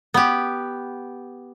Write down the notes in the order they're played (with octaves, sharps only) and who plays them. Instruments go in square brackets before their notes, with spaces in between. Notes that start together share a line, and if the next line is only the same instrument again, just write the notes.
[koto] B3 G4